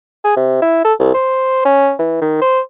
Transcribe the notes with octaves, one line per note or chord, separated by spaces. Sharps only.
G#4
C3
E4
A4
C2
C5
C#4
E3
D#3
C5